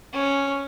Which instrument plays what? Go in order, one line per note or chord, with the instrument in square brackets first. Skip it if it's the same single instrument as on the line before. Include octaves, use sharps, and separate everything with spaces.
[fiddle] C#4